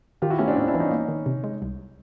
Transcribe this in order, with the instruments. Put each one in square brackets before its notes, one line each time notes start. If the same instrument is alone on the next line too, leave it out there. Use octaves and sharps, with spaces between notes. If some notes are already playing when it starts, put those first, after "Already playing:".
[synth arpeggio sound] D#3 [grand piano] F4 G4
[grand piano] E4 F#4
[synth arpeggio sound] A3 [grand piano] B3 C#4
[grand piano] C4 D4
[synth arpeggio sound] A2 [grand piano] C#4 D#4
[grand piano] D4 E4
[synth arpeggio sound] E3
[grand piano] C#4 D#4
[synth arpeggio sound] A#3
D#3
C3
G#3
C2